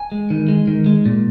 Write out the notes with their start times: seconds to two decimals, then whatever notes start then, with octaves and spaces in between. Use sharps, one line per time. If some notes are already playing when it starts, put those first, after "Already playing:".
Already playing: G#5
0.12 G#3
0.30 D#3
0.48 G#3
0.67 D#3
0.86 G#3
1.06 A#2